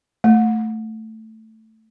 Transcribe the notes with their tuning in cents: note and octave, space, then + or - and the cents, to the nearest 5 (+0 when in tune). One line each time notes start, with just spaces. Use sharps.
A3 +5